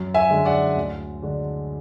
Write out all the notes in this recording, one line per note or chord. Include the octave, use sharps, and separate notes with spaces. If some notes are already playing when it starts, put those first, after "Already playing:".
Already playing: F#2
E5 G#5
D3 G#3 D4
D5 F#5
D2
D3 G#3 D4